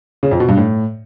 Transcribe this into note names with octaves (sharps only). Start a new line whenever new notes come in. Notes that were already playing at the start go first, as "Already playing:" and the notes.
C#3
F2
B2
G2
A2